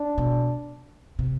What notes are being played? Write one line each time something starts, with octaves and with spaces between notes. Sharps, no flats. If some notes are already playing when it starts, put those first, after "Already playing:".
Already playing: D4
B2
C3